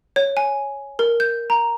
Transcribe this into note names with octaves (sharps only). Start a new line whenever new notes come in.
C#5
G#5
A#4
G6
A#5